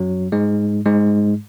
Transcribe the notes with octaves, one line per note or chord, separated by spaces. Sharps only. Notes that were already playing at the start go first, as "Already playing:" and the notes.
Already playing: F#2 F#3
G#2 G#3
G#2 G#3